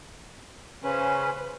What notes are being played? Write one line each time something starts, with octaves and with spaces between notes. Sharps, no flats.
C#3 C#4 B4 C5